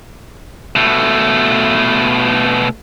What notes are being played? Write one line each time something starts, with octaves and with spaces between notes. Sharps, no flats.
B2 A3